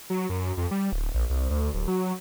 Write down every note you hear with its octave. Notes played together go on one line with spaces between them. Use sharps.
F#3
F#2
F2
G3
D1
A#1
C2
D2
D1
F#3